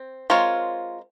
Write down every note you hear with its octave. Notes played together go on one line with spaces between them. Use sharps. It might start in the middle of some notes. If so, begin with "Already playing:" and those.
Already playing: C4
G#3 C4 F4 A#4 C#5